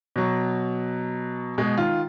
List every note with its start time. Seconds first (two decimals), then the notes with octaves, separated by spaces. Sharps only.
0.16 B2 F#3
1.58 B2 G#3
1.77 D#3 F4